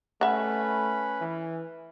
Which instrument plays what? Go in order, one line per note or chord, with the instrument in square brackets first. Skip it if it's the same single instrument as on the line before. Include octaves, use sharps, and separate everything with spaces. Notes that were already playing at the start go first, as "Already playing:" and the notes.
[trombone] A3 [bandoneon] C#4 B4 B5 [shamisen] E5 F#5
[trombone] E3